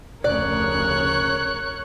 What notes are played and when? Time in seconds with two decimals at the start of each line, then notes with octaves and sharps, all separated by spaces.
0.24 F1 D2 C#3 A#4 C#5 D5 F#6